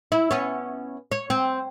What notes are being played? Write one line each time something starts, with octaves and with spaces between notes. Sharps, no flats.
E4
B3 C#4
C#5
C4